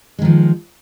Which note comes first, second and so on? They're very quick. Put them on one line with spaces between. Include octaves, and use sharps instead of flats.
G#3 D#3 F3